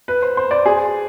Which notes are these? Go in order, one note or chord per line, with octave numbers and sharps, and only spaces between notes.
B4
C5
C5
D5
G#4